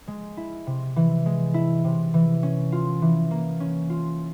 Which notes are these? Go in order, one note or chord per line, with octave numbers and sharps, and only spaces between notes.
G#3
E4
C3
E3
G#3
E4
C3
E3
C#4
F4
E3
A#3
C#4
F4